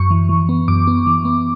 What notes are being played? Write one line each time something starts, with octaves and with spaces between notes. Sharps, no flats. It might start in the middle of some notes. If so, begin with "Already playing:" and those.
Already playing: F#2 C#6
E3
E3
B3
F#2 D6
B3
E3
B3